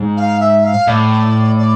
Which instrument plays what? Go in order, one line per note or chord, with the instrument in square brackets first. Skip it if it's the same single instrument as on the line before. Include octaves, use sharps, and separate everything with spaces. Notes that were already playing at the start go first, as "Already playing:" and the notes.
Already playing: [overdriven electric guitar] G#2
[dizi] F5
E5
F5
[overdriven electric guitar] A2 [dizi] D5
[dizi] D5